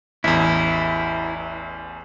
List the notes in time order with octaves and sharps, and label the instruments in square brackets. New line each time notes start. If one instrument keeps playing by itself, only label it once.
[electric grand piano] A1 E2 [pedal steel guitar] E4